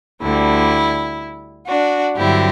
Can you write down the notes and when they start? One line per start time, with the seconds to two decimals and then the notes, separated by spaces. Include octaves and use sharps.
0.22 D2 D3 G3 E4
1.67 D4 F#4
2.16 G2 D3 F#3 C4 E4 G4